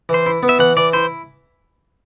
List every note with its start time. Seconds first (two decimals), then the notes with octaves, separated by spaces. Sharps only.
0.09 E3 C5
0.26 E4
0.43 B3
0.49 E5
0.59 E3 F#5
0.77 E3 D5
0.93 E4 C5